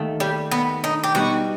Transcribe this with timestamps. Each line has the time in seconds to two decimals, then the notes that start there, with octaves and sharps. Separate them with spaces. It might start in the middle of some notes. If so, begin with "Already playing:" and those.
Already playing: D#2 D#3 A3
0.20 G3
0.51 B3
0.84 D#4
1.04 G4
1.15 B2 G3 B3 D#4 F#4